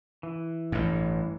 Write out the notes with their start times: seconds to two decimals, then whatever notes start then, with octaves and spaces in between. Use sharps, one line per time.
0.23 E3
0.72 A1 G2